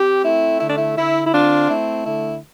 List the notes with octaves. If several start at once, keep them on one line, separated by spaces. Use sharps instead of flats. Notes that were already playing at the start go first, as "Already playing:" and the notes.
Already playing: C4 G4
A3 E4
D3 E4
D4
E4
D3 E4
E4
C4 D4 F4
A3 E4
D3 E4